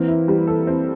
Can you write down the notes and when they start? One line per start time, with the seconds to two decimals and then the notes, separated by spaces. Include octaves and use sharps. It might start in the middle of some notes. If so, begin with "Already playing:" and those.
Already playing: E3 A#3 C4
0.08 E4
0.28 G3
0.47 A4
0.67 C4